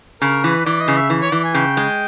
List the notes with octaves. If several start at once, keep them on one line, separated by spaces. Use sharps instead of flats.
C#3 A#4
E3 B4
E3 D5
D#5
C#3
E5
E3
C#5
E3 D5
G#5
C#3 G5
G#3